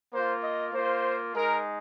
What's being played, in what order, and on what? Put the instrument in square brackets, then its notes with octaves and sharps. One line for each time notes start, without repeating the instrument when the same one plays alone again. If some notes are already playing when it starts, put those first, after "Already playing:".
[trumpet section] A#3 F4 C5
D#5
A#3 F4 C5
G#3 D#4 A#4